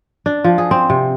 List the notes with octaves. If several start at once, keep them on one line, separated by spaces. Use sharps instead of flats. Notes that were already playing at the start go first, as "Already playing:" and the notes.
D4
F3
G#4
C4
C3